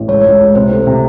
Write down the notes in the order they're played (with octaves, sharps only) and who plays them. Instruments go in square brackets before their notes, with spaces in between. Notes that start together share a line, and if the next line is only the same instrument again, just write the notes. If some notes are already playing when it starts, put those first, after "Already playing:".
Already playing: [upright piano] A1
[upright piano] C#2 [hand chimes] C#5
[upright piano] C#2
C#2
[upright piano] C3 [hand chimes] C5
[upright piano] A3
C3